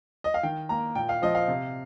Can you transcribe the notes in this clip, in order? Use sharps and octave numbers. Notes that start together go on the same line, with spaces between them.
D#5
F5
D#3 G5
A#3 A#5
A#2 G5
F5
F3 C4 D#5
F5
C3